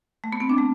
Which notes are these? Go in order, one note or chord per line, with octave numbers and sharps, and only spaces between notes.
A3
B3
C4
D4
A3